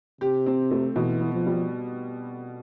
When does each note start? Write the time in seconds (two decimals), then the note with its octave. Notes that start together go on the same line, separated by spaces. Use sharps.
0.21 C3 G4
0.46 C4
0.71 A3
0.96 B2 E3
1.21 B3
1.34 F3
1.46 G3